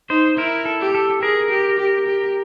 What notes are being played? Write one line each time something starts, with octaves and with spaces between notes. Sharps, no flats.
D#4 C5
E4 A#4
A4
G4
A4
G#4 A#4
G4
G4
G4